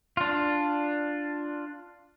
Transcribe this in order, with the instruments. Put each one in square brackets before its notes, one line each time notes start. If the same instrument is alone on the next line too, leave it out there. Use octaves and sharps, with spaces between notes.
[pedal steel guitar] D4 F4